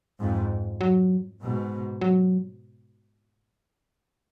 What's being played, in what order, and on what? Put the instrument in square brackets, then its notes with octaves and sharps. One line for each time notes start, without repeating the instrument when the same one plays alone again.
[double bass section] F2 G#2
[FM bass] F#3
[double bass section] G#2 B2
[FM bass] F#3